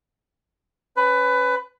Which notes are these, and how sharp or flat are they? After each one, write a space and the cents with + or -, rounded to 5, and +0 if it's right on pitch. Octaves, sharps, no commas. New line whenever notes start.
C#4 +0 B4 +20